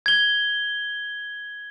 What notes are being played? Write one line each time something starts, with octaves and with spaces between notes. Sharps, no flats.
G#6 G7